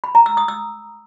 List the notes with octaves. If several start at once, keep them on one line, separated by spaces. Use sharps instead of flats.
B5
A#5
E6
D#6
E6